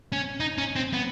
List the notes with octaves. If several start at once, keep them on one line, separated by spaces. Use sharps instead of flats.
C#4
D#4
C#4
C4
B3